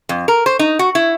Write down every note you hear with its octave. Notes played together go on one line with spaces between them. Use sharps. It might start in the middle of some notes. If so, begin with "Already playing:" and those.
F2
A#4
C5
D#4
F#4
E4